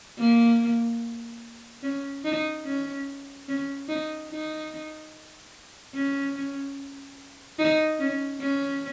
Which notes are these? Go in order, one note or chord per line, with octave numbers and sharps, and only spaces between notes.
A#3
C#4
D#4
C#4
C#4
D#4
D#4
C#4
D#4
C#4
C#4